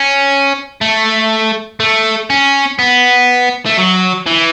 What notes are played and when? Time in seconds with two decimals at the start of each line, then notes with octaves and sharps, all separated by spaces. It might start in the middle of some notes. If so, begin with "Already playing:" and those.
Already playing: C#4
0.81 A3
1.80 A3
2.30 C#4
2.79 B3
3.66 A3
3.78 F#3
4.27 E3